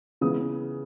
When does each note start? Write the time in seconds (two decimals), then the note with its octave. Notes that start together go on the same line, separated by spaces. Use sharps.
0.21 C#3 E3 G#3 B3 D#6